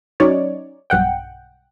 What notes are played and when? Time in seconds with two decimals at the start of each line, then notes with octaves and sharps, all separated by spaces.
0.20 F#3 C#4 D#4 C#5 D5
0.90 B1 G2 F#5 G5